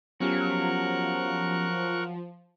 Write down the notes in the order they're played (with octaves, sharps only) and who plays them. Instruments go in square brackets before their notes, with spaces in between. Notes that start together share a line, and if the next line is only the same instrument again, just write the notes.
[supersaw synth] F3 [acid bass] F#3 [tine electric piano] B3 C#4 G4 [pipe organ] A#4 C#6 F#6